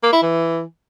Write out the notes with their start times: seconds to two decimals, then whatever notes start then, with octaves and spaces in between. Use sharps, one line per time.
0.03 A#3
0.13 E4
0.22 E3